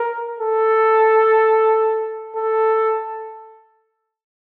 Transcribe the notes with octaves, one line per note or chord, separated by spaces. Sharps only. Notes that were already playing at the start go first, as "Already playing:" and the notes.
Already playing: A#4
A4
A4